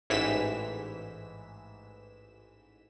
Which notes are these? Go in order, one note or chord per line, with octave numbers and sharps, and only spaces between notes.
A1 G#2 E3 B6 E7